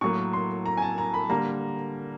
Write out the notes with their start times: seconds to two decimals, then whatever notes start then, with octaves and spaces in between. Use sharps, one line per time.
0.01 A2 F#3 A#3 C#6
0.33 C6
0.66 A#5
0.77 G#5
0.82 A5
0.98 A#5
1.14 B5
1.30 D3 G3 A#3 A#5